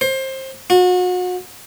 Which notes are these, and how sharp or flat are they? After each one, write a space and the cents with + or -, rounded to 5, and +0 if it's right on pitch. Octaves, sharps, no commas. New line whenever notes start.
C5 +25
F#4 -35